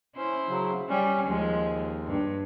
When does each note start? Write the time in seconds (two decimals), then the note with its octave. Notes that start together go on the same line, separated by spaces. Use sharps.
0.16 C#4 E4 C5
0.48 C#3 F#3
0.89 G3 C#4
1.26 D#2 F3 G#3
2.07 G2